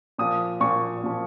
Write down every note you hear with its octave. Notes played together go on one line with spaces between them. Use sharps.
A#2 F3 D#6
A#2 F3 C#6
A#2 F3